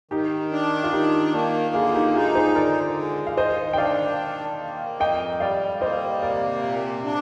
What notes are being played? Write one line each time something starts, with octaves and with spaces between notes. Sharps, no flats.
D#3 D#4 G4
D4
F4
D#3 D#4 G4
A#3
D3 F4 G#4
D#4 G4
D#4 F4 G#4
G#4 C5
D3 A#4 D5
G#3
F5
D#3 C5 D#5
G5
D4 D5 F5
D#3
A#3
F2 D#5 G5
G3 D5 F5
A#3 C5 D#5
C3 A#4 D5
A#2
D4